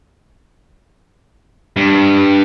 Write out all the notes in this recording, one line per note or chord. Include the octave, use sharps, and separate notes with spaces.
G2